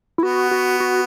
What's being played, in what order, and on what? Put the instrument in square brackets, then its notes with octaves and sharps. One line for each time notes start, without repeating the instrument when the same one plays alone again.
[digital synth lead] E4
[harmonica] B3 [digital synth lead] F#4
[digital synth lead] F#4
F#4